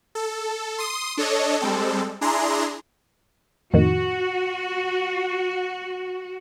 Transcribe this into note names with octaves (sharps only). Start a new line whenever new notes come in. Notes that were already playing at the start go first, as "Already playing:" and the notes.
A4
C6 D#6
D4 A4 C#5 D#5
G3 G#3 C4 A4
D4 E4 G#4 A#5 C6
F2 A2 D#3 F#4